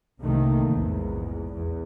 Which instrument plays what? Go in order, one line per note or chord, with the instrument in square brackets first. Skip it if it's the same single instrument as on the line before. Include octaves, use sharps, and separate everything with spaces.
[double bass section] C2 C3 D#3 A3 A#3
A#1 E2 G#2
E2